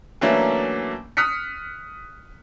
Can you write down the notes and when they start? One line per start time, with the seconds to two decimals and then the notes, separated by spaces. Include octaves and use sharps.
0.21 E3 F#3 A3 A#3 C#4 D4
1.17 D#6 F6 F#6 B6 C#7